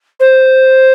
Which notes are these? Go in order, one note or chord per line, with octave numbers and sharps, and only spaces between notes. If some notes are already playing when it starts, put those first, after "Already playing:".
C5